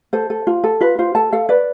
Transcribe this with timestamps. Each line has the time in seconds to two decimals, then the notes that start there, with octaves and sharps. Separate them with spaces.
0.13 A4 C5
0.30 A4
0.47 F4
0.64 A4
0.81 F4 B4
0.99 F4 C5
1.15 A4 A5
1.32 A4 F5
1.49 B4 D5